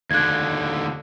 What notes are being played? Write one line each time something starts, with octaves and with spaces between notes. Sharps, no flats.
D#2 D3 F#6 G#6